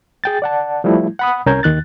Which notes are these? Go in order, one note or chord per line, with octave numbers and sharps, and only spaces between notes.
G#4 G5 A6
D5 F#5 A5
F3 G3 A3 E4
F#5 B5 D#6
C2 C#4 A#4 A#5 G6 G#6
D#2 D#3 F#6 A6